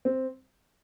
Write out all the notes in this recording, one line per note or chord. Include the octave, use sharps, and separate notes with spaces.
C4